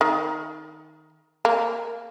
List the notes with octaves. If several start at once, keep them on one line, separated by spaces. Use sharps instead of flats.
D#3
A#3